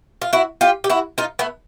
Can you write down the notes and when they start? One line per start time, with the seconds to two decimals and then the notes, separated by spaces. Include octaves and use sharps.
0.22 F4
0.33 E4 F#4
0.61 F4 G4
0.84 G4
0.90 E4 F#4
1.18 D#4 F4
1.39 A3 B3